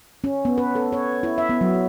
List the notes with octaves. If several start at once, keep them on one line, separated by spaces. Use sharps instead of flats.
C#4
B3
B4
A4
C#5
E4
E5
B3
F#3